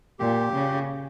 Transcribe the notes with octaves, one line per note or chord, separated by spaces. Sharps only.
A#2 G4
C#3